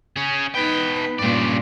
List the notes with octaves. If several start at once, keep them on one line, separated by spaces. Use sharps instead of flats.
C#4 G#4
B2 D#4 B4 G5
G2 A#2 C#3 D5